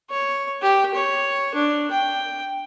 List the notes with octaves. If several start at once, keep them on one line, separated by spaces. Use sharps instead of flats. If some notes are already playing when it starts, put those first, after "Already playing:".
C#5
G4
C#5
D4
G5